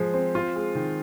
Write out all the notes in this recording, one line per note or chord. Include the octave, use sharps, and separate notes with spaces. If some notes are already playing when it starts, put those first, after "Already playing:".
Already playing: F3 G#3
C4
F4
G#3
D#3